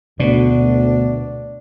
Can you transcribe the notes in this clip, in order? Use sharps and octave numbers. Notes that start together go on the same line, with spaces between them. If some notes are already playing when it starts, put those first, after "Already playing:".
D2 B2 D4